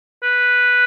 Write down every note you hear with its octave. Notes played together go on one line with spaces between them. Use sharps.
B4